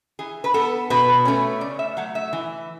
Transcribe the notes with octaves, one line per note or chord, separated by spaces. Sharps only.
E3 G#4
B4
B3 A4
B2 B4
A3 C#4
C#3 D5
E5
F#3 A3 F#5
E5
E3